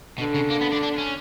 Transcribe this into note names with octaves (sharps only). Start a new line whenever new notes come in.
B2 D3
C#3
A#3
B3
D4
D4
C#4